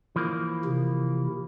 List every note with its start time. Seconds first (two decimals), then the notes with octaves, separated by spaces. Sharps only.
0.16 E3 F3 A#3
0.65 C3